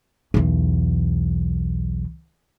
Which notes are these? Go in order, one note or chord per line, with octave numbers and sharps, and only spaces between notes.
B1 E2